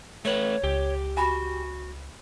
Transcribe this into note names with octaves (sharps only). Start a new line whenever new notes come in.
A3 B4 C#5
C#2 G4
F#4 G#5 B5